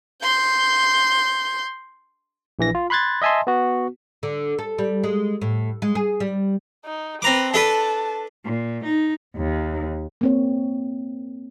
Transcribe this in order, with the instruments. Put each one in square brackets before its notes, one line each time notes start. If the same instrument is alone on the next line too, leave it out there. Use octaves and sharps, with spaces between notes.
[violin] C6 G6
[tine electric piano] A#1 E3 A#6
F4
B5 C6 F#6 G#6 A6
D#5 E5 G#5 A5 C6
B3 F#4
[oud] D3
A4
G3
G#3
A2
G#3
G#4
G3
[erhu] D#4
[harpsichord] C4 A#5 D6 [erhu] B4
[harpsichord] D4 A4 B4 [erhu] A5
[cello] A#2
D#4
[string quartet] D#2
[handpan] A#3 C4 C#5